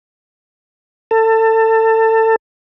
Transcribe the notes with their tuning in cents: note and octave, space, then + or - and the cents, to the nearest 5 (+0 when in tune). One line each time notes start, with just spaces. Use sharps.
A4 +25